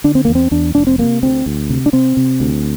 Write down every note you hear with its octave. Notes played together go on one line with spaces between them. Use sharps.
D3 D4
C4
E2 A#3
C4
E2 D4
F1 D4
C4
C3 A#3
D2 C4
D2
C3
D4
C3 C4
C3
D2